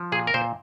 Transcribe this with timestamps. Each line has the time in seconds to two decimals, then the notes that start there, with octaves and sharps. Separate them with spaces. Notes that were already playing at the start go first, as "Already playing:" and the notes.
Already playing: F3
0.12 A#2 G#4
0.27 A#4
0.34 A#2 C5